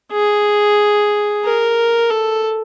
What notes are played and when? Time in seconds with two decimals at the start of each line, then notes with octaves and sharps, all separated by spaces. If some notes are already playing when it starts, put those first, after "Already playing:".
0.12 G#4
1.44 A#4
2.10 A4